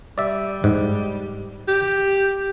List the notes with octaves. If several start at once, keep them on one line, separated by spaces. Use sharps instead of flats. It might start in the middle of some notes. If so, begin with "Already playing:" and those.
G3 D5 E5
G#2
G4